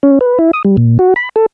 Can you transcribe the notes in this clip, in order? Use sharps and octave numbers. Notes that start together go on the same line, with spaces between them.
C#4
B4
E4
D#6
G3
A#2
F#4
B5
A4